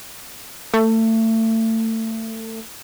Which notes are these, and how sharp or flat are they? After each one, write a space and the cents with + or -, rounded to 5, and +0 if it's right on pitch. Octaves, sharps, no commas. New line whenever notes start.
A3 +30